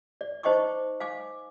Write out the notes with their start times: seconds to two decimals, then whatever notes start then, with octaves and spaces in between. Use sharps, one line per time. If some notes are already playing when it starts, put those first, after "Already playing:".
0.21 D5
0.43 D#4 C5 D#5 G5 C#6 D6
1.00 F5 G#5 D6